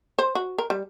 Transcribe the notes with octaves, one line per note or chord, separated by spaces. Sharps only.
C5
F#4
A#4
G3